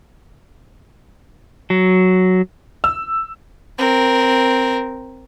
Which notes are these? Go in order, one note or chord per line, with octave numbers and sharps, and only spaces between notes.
F#3
E6
C4 A#4